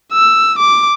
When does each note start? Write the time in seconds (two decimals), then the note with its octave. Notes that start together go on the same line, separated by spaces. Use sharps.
0.13 E6
0.59 D6